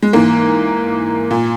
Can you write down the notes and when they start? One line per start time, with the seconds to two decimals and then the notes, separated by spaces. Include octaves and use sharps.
0.03 G#3
0.13 G#2 E3 A#3
1.31 A#2